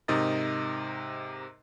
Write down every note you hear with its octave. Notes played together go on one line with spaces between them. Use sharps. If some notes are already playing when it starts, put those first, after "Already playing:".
G#2 C3 D#4 A#4 D#5 A6